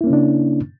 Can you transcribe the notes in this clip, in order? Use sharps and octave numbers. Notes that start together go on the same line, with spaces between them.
C#3 A#3 C#4 D4 E4